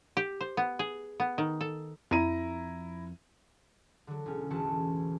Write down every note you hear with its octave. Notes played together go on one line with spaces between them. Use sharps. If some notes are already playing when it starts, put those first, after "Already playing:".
G4
C5
B3
G#4
B3
D#3
A4
F2 E4 A#5 D#7
D3 F#3
E1 C#4
A1 E2 E3 F#4 A5 C#7